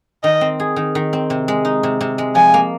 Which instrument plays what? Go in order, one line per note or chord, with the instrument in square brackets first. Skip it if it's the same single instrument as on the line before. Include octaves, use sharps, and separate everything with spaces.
[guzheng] D#3 [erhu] D#5
[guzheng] C4
G#4
D#3
D#3
C4
C3
G#3
D#4
C3
C3
G#3
[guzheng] F3 [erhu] G#5
[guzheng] A#3